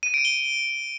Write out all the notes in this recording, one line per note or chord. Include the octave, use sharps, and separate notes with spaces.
D#7
D7
G7